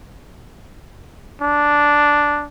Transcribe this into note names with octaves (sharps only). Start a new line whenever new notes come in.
D4